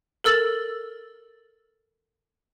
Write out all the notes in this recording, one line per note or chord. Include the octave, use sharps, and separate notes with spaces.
A4 A#4 E6 A6 F#7